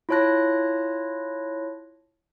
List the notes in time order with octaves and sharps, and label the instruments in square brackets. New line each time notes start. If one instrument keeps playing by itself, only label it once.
[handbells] E4 F4 C#5 A5 F#6 A#6